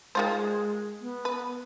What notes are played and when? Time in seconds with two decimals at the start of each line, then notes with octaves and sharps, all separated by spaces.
0.15 D#3 G#3 F4 C5
1.01 B3
1.25 B4